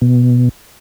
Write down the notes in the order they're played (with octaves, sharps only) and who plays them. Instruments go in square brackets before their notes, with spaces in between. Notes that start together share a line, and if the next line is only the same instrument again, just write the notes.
[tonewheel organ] B2